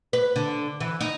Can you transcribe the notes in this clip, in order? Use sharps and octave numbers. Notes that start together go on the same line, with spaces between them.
B4
D3
E3
D#4